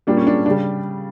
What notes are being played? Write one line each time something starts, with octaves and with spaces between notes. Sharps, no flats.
A#2 G3 A#3 D4
C#4
D4
C#3 G3 D4